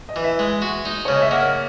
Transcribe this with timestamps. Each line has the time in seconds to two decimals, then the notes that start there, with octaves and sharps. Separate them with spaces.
0.09 D#5
0.16 E3
0.24 E5
0.39 G#3
0.62 F#4
0.85 D#4
1.05 C#3 C#5
1.14 D#5
1.22 E5
1.31 A#3 F#5